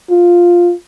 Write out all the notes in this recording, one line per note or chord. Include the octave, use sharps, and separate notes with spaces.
F4